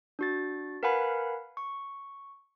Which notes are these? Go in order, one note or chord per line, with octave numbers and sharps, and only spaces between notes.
D4 F#4 A6
A#4 B4 F5 F#5 G#5 B5
C#6